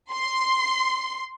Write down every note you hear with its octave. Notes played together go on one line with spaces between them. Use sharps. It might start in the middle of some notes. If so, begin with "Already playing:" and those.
C6